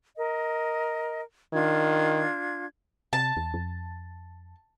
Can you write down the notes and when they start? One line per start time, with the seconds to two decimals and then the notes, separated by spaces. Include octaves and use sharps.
0.16 A#4 D#5
1.53 D#3 D4 F4 G#6
3.13 C3 A5
3.37 E2
3.54 F2